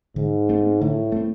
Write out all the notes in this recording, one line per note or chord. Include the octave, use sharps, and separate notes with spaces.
G#2 D3
A3 C4
A2 D3
A3 C4